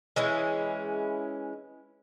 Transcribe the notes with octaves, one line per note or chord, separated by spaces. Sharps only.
E3 G#3 C#4 E4